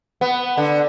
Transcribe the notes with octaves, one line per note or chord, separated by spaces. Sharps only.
B3
D3